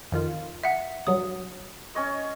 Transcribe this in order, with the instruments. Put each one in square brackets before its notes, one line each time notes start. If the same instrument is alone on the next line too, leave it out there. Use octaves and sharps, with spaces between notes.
[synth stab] F2 D#3 F4
[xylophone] E5 F#5
[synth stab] A#1 G2 F#3 [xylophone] D#6
[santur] C#4 C#5 D#5